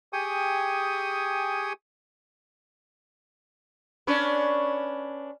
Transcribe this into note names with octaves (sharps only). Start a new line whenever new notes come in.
G4 G#4 G5 G#5 C#6 D#6
C#4 D4 B4